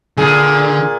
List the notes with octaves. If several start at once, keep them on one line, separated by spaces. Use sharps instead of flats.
A#2 D3 G#4